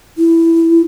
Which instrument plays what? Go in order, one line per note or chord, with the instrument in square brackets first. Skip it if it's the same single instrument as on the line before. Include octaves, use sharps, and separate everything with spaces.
[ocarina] E4